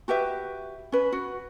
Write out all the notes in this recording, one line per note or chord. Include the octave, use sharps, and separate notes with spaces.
F#4 G4 B4 E5
C#4 B4
F#4